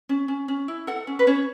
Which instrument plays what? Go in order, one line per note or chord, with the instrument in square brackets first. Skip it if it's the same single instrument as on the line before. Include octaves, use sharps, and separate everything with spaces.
[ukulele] C#4
C#4
C#4
E4
A4 F#5
C#4
B4
C#4 C#5